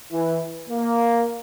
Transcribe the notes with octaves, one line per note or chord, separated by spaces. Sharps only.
E3
A#3